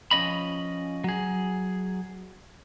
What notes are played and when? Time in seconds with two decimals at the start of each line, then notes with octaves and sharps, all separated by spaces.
0.11 F3 C#4 D#5 B5
1.04 F#3 G#4